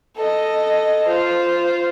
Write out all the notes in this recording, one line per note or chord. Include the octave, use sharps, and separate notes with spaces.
A4 D#5
F4 C5